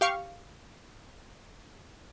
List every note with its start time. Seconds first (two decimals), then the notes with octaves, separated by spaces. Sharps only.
0.01 G4 F5 C#6